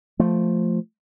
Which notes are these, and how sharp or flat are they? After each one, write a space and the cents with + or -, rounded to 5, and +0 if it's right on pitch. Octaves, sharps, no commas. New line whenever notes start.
F3 +0 A3 +0